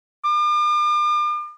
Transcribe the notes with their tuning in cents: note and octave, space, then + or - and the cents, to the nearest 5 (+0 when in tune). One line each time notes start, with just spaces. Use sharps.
D6 +40